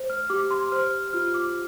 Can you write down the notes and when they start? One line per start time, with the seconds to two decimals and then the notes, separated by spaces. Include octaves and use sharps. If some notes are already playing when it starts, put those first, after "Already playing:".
Already playing: C5
0.10 F6
0.30 G4 D6
0.51 C6
0.72 C5 F6
1.13 F4 F6
1.34 D6